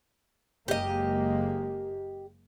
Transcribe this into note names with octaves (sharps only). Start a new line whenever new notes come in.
F#1 G#3 A#3 G4 D#5